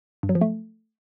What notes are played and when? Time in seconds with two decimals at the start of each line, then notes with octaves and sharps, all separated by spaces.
0.23 G2
0.29 F#3
0.35 F3
0.41 A3